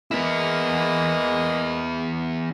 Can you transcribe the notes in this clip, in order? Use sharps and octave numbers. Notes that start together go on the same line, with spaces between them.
G#3 A#3 B3 E4 D#5